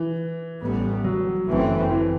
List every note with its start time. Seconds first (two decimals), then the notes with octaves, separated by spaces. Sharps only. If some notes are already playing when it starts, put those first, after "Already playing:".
Already playing: E3
0.61 A1 A2 G3 B3
1.04 F#3
1.47 G1 F#2 E3 A3 C4
1.91 E3